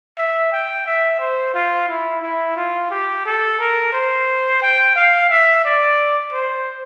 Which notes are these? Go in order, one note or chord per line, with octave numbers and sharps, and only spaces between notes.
E5
G5
E5
C5
F4
E4
E4
F4
G4
A4
A#4
C5
G5
F5
E5
D5
C5